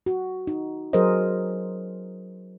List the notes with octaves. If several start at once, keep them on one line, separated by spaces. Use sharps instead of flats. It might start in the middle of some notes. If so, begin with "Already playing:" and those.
F#4
D#4
F#3 G#4 A#4 C5 D#5